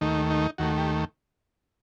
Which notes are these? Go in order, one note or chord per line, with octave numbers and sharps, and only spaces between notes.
D#2 D#3 A3 D#4
D#4
D#2 D#3 A3 F#4
G4